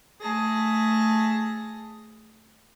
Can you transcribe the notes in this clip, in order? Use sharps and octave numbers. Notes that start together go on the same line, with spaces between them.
A3 G#4 A5 A#6